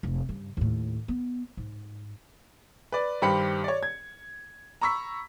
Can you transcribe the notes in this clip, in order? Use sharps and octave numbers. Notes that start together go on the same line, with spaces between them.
F1
G2 C#3
D#2 A2
B3
G#2
B4 D5
G2 D#3 G4 C5 B5 C#7
C#5 D5
G#6
A#5 B5 C#6 E6 B6